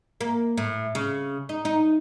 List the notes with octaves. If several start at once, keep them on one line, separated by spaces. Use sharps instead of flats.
A#3
A2
C#3
D#4
D#4